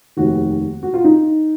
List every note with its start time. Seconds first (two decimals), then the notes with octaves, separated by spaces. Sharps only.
0.16 F1 D#2 D#3 F#4
0.83 F#4
0.94 F4
1.04 D#4